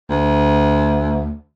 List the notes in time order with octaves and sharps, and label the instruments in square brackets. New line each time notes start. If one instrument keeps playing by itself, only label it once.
[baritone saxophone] D2